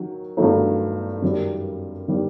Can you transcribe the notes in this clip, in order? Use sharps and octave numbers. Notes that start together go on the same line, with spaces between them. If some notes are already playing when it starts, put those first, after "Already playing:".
Already playing: D#3 F#3
G2 D#3 F#3 A3 D#4
F#2 D#3 G3
D#3 G3